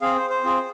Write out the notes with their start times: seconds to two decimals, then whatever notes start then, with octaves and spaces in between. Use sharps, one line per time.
0.01 C4 G#4 F5
0.16 C5
0.30 C5
0.44 C4 F4 G#4